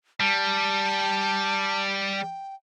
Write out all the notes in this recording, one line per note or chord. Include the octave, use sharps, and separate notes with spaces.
G3 A5
G5